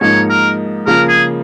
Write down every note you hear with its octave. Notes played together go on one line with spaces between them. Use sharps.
G#2 F3 A#3 D#4 C#5
A#4
C#3 F3 A#3 F4 A#4
G#4